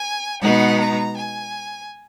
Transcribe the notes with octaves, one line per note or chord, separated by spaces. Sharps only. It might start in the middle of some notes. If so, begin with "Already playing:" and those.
Already playing: G#5
B2 G#3 B3 D#4 F#5
A#5
G#5